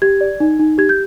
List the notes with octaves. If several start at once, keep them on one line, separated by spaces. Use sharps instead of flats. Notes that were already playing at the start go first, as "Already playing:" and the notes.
G4 G#6
D5
D#4
D#4
G4 G#6
G6